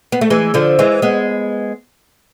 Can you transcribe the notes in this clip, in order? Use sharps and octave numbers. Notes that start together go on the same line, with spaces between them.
B3
A3
E3 G#3
D3 F3
E3 G#3
G#3 B3